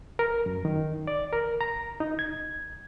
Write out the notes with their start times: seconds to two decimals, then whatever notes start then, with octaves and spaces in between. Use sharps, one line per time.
0.19 A#4
0.46 F#2
0.65 D#3
1.07 D5
1.33 A#4
1.61 A#5
2.00 D#4
2.19 G#6